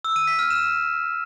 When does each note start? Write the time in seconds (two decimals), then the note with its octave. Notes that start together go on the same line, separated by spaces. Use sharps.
0.05 E6
0.16 D#7
0.27 B6
0.39 F6
0.50 E7